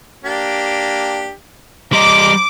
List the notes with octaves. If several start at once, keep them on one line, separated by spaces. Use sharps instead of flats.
A#3 D4 G4
G3 C5 D#5 A#5 D6